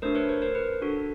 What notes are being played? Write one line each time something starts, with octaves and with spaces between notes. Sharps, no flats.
A3 D4 F#4 A#4 C5
B4 C#5
A#4 C5
A#4 C5
B4
D4 F#4 A4